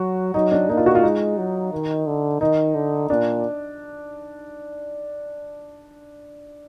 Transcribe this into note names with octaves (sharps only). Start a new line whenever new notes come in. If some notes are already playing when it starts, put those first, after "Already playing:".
Already playing: F#3 F#4
F#3 D#4
D4
A#3 D#4
F4
F#4
F4
G#3 D#4
F#3
D#3
D3
D#3 D#4
D3
A#2 D4